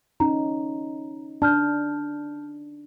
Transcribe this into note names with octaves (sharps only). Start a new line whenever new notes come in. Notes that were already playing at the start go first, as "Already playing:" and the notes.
C#4 D#4 A#5
D4 A5 F6 G6